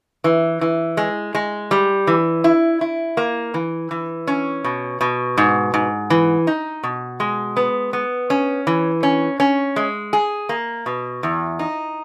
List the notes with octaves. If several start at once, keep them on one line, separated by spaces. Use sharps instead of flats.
E3
E3
G#3
G#3
G3
E3
E4
E4
A#3
E3
E3
C#4
B2
B2
G#2
G#2
E3
D#4
B2
G#3
B3
B3
C#4
E3
C#4
C#4
G#3
G#4
A#3
B2
E2
D#4